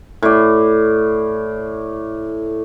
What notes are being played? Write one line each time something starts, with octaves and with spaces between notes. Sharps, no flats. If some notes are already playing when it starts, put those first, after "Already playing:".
A2 D5